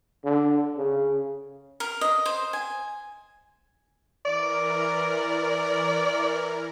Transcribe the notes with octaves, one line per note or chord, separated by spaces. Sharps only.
D3
C#3
A#4
D#5
C5
G#5
E3 A#4 D5